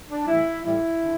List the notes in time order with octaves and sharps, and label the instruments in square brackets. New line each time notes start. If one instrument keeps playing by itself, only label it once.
[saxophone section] D4
A2 E3 G3 E4
A2 E3 G3 E4
D3